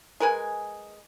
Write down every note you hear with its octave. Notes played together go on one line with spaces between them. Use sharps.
G#3 A#4 B4 G#5